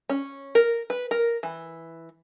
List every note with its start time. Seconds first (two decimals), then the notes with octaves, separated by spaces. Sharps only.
0.10 C#4
0.55 A#4
0.90 B4
1.11 A#4
1.43 E3